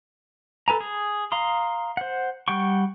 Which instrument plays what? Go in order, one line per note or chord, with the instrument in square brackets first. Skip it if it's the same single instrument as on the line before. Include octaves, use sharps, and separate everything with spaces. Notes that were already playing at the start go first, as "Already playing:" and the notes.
[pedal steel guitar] A4 B4 G#5 A#5
G#4
F5 A#5 C6 D#6
C5 F#5
G3 F#5 G5 C#6